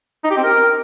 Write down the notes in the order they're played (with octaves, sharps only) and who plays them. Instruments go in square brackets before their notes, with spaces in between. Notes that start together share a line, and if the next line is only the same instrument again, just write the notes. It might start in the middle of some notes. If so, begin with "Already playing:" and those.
[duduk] D#4
G4
C4
A#4